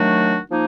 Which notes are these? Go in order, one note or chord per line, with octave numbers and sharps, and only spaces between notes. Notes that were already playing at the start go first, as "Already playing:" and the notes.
Already playing: D#3 F#3 A3 D4 F#4
F3 A#3 D#4